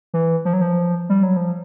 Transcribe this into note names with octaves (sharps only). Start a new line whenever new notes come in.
E3
F3
F#3
F3
G3
F#3
F3